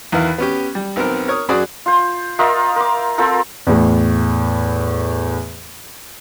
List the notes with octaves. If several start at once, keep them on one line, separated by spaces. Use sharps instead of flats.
E2 D#3 E4 B4 F5
B3 C#4 G4
G3
B1 B3 C4 A#4
A#4 C#5 D#6
F#2 F#3 F#4 G#4 D5 D#6
F4 C5
F4 A#4 D#5 E5
A#4 D6
C4 F4 A4 A#4
E2 A2